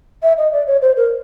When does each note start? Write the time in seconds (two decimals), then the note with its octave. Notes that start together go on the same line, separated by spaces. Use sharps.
0.23 E5
0.38 D#5
0.52 D5
0.67 C#5
0.82 C5
0.97 A#4